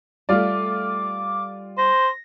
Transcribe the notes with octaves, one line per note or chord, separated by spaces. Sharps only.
G3 A3 F4 D5 D6
C5 A#6